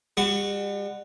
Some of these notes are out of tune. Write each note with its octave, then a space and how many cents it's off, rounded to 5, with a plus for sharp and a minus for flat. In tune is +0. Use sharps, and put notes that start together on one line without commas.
G3 +40 F#4 +0